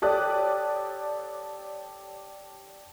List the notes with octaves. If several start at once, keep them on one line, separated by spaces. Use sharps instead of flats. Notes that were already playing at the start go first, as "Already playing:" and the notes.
G4 A4 C#5 D5 D#6 F#6